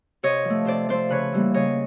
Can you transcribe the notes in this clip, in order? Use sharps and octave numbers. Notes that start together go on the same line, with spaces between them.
C3 C#5 D#5
F3
A3
C3 C5 D5
F3 A3 C5 D5
C#3 B4 C#5
E3 G3 A#3
C#3 C#5 D#5